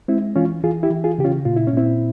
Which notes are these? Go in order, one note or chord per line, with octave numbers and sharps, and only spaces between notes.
G#3 C4 E4
E3 C#4 F4
E3 F4 G#4
E4 G4
E3
F4 G#4
C#3 G4
C#4 F4
A#2 F4
E4
C#4
A#2 C4 E4